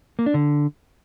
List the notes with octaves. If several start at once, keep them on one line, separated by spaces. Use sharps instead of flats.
A#3
D4
D3